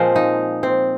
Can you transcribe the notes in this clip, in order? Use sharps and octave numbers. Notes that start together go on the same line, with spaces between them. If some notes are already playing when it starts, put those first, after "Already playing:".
Already playing: A#2 F3 G#3 C4
D#4
C4